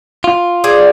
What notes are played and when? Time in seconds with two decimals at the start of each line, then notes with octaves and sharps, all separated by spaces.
0.24 F4
0.64 G#4 C5 D5